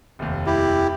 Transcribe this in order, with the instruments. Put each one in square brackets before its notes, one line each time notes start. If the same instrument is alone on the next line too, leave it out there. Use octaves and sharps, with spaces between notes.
[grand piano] F1 D#2
[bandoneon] E4 G4